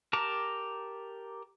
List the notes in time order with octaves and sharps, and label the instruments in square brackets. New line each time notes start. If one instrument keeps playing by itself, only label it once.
[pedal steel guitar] G4 A#4 A5 A#5 D6